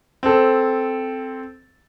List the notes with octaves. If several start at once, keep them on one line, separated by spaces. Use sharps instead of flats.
C4 A4